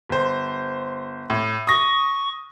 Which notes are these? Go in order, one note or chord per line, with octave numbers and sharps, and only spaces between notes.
G1 C5
A2
C#6 D#6 A#6